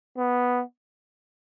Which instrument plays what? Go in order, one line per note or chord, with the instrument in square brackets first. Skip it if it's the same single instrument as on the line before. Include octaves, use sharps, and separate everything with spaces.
[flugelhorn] B3